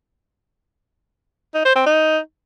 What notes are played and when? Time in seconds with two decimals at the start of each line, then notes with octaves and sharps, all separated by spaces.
1.54 D#4
1.65 C5
1.75 C4
1.86 D#4